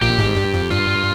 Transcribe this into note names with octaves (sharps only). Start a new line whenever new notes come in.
A#1 A#2 G4
G#1 G#2
G2
F2
G2 F4